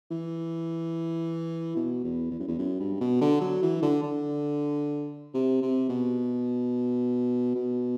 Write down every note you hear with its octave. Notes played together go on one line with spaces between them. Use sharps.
E3
B2
E2
E2
F#2
E2
F#2
G2
B2
D3
F#3
E3
D3
D3
C3
C3
B2
B2